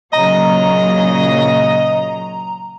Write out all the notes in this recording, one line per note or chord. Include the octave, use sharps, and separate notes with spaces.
A#2 C#3 F#3 D#5 A#5